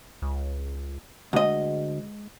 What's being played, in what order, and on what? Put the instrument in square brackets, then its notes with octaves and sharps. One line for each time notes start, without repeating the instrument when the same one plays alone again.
[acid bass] C#2
[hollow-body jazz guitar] D2 D#5 [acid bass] G#3